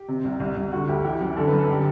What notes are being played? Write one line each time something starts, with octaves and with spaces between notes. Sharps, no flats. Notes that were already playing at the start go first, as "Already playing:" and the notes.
Already playing: G4
C3
C2
C2
C2
D3 F#4
D2 G4
E3 G4
F#2
D3 A4
B4
F#2
A4
D3 G4